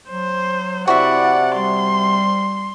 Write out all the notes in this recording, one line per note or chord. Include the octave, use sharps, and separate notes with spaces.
F#3 C5
C3 E4 F#4 D5 E5 F#5
G3 C6